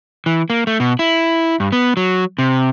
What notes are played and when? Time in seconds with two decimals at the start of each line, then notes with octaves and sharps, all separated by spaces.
0.26 E3
0.50 A#3
0.67 A3
0.80 B2
0.99 E4
1.60 G2
1.72 B3
1.97 F#3
2.38 C3